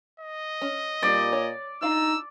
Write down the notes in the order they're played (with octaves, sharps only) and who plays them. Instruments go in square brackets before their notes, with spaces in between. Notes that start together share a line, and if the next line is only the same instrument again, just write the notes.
[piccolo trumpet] D#5
[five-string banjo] C#4
[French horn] A#2 [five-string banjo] G3 C4 D#4 [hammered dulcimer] D5
[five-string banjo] C#5
[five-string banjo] D4 F4 F5 [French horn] D#4 [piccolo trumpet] E6